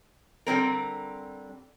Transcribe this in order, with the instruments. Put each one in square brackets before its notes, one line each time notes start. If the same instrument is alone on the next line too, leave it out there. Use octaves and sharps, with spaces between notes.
[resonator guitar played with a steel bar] D3 G3 C4 A#4